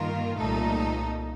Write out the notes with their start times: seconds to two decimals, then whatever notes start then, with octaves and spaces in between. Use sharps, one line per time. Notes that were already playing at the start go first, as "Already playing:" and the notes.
Already playing: G2 D#3 A#3 F4 A#4
0.38 C2 A#2 A3 D#4 A4